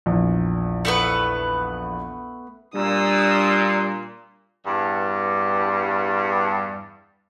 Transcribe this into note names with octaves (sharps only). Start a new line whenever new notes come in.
A#1 E2
A3 B3 B4
A#2 G3 D4 D#6 E6
E2 G2